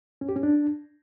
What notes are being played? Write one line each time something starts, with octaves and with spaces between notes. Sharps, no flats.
C#4
G4
C#4
D4